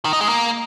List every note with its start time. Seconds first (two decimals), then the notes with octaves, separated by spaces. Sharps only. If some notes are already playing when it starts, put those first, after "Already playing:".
0.05 D#3
0.13 D#4
0.21 G#3
0.29 A#3